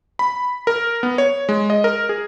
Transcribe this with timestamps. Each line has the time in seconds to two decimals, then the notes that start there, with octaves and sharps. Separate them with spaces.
0.19 B5
0.67 A#4
1.03 B3
1.18 C#5
1.49 G#3
1.70 D#5
1.84 A#4
2.09 G#4